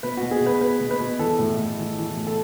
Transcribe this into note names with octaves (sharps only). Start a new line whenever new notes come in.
B2 B4
B2 F#4
G#4
B2
B4
B2 B4
B2
B4
B2
E3 A4
A2
A2
E3
E3
A2
A4